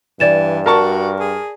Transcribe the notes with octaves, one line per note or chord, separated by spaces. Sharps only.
G2 E3 D5 A6 E7
F#4 A#4 A5 C#6
G#4